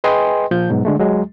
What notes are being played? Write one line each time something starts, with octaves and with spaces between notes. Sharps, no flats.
G#4 B4 D#5 G5 G#5 C6
A#2 F3 G6
G#2 B2 F#3
D3 G#3 A3
D2 F#3 G#3